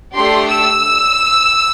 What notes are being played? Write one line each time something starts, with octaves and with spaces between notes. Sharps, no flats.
A3 D4 G4 C6
E6